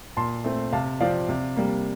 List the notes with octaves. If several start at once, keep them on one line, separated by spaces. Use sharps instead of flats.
A#2 A5 C6
A3 C4
C3 F5 A5
F3 C4 D5 F5
C3
G3 A#3